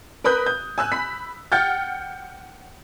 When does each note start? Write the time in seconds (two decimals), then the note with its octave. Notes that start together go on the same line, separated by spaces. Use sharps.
0.24 A#4 B4 B5 D#6 F#6 G6
0.46 G6
0.78 G#5 E6 F#6
0.92 B5 B6
1.52 F#5 G5 F6 G6 A6